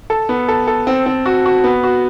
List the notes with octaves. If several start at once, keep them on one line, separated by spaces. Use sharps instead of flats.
A4
B3
A4
A4
C4
C4
F#4
F#4
B3
F#4